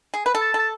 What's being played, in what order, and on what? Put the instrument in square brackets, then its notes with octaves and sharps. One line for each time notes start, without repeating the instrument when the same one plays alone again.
[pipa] G#4
B4
A4
[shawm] A5
[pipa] A4 [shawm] A5